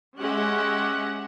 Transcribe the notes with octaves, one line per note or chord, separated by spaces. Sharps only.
G#3 C#4 G4 E5 F#5